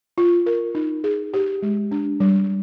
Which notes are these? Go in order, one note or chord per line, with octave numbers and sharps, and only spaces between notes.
F4
A#4
D#4
G#4
G4
G#3
D4
G3